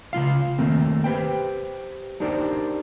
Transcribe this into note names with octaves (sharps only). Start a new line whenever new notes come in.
C#3 G3 F4 F5
D#3 A3 A#3 C4
G4 B4 C5 G5
D4 D#4 G4 A#4 C5 D5